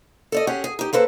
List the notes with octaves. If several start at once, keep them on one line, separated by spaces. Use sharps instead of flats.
A4 D5 D#5
C#4 G4 G#4 F#5
G#4
D#4 G4
A#3 C4 A4 B4